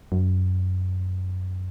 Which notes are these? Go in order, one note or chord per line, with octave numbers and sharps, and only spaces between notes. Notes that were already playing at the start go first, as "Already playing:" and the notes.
F#2